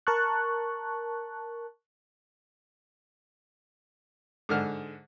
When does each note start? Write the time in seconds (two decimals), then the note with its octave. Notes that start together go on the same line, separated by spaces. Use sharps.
0.07 A#4 A5 C#6 F#6
4.49 G#2 D3 F6